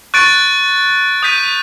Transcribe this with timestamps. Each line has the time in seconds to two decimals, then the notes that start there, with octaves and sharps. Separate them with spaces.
0.14 C#6 F#6 A6 D7
1.23 D#6 G6 B6 D#7